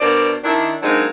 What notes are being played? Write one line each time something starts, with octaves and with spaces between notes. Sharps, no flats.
B2 D4 A#4 C5 D5
D#3 D4 E4
F#3 G#3 A#3 C4 D4 D#4